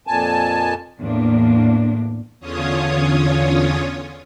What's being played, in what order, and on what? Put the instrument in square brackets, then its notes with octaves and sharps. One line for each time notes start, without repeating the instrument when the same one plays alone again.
[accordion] F2 A#2 G#5 A5
[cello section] E2 A2 A#3 D4
[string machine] E2 D3 C#4 F4 C#5 D#6